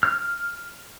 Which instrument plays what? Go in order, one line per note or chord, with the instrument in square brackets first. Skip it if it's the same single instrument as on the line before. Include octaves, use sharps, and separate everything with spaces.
[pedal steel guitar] F6